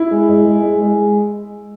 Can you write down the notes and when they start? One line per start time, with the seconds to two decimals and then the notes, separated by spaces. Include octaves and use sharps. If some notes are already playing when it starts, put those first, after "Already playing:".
Already playing: E4
0.11 G#3
0.29 G#3
0.46 G#3
0.63 G#3
0.81 G#3